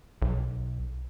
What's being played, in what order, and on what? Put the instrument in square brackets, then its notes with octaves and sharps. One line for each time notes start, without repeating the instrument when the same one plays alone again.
[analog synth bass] B1